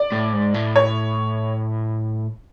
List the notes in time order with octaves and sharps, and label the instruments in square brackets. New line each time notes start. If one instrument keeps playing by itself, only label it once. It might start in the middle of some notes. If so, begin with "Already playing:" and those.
Already playing: [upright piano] D5
[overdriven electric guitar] A2
G#2
A2
[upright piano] C#5